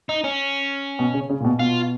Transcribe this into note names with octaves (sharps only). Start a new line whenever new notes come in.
D#4
C#4
B2
C#3
C#3
A#2
B2
B2 F4